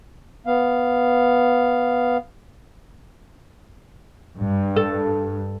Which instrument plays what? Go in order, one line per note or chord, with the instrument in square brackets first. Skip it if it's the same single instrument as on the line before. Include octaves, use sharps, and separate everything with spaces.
[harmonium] B3 F5
[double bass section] G2
[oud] A4